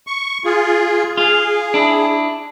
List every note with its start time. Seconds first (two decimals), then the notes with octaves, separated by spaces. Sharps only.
0.07 C#6
0.45 F4 G#4
1.17 F4 G#4
1.74 D4 E4